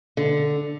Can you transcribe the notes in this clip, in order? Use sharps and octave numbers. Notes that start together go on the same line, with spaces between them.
D3